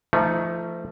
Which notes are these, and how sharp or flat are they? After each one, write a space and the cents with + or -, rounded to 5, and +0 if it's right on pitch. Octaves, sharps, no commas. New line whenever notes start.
F3 -30 A3 +10 D#4 +10